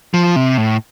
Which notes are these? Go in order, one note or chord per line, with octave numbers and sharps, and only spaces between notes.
F3
C3
A2